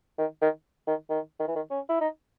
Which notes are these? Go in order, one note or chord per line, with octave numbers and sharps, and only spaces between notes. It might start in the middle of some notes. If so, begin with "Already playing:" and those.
D#3
D#3
D#3
D#3
D#3
E3
D#3
C#4
E4
D#4